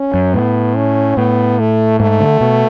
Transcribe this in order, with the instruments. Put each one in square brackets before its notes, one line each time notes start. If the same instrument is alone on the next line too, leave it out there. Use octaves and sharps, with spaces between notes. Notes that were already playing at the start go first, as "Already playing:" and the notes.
Already playing: [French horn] C#4
[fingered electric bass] F#2
[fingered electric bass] A2 [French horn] B3
[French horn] C#4
[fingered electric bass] A2 [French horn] B3
[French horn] A3
[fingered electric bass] G#2 [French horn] A3
[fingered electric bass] D3
B2